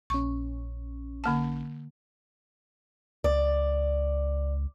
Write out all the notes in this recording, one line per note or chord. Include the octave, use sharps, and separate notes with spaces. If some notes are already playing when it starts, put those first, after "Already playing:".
A#1 C#4 C#6
D3 A#3 A5
C#2 D5